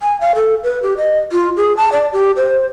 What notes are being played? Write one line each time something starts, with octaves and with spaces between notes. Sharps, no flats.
G#5
F5
A4
B4
G4
D#5
F4
G#4
A5
D5
G4
C5